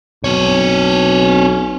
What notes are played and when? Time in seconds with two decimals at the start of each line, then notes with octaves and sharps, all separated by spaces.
0.24 B1 C4 C#5